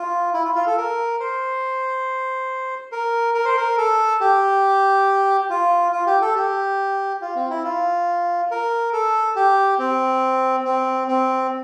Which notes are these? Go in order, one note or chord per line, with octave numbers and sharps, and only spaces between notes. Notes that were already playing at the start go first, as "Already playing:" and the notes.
Already playing: F4
E4
F4
F4
A4
A#4
C5
A#4
A#4
C5
A#4
A4
G4
F4
F4
G4
A4
G4
F4
C4
E4
F4
A#4
A4
G4
C4
C4
C4